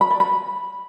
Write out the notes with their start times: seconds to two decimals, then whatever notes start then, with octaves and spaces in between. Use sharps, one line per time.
0.01 B5
0.10 D5
0.20 B5